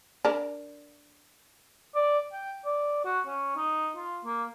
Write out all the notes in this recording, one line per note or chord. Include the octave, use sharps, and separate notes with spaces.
D4 A#4
D5
G5
D5
F#4
C#4
D#4
F4
A#3